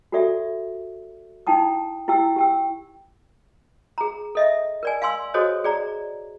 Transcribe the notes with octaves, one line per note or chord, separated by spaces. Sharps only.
F#4 G4 A4 D5 E5
D#4 E4 G5 A5 D#6
E4 G4 G5 E6
G4 G5 E6
G#4 A#5
A4 D#5 E5
A#4 D5 G#5
F5 G#5 C6 E6
F#4 G#4 A4 C5 C#5 D#5
G#4 D5 A#5